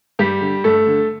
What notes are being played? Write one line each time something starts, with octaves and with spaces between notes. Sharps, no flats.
G2 G3 G4
D3
G2 A3 A4
D3